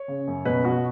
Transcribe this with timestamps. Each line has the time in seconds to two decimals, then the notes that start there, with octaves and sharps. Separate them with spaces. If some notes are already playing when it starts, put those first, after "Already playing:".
Already playing: C#5
0.08 C#3
0.27 F#2
0.45 B2 B4
0.64 B2 F#4